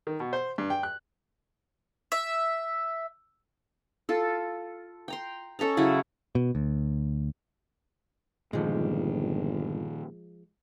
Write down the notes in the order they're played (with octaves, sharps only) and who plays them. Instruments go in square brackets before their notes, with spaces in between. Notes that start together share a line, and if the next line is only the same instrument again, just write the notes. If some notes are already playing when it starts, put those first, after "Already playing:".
[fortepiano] D#3
B2
C5
G2
G5
F#6
[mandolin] E5
[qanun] F4 A4
G5 A#5 C6
C#4 A4 D#5 A#5
C#3 F#3 E4
[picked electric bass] B2
D2
[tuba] G1 [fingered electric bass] A#2 D#3 [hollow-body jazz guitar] F3 G#3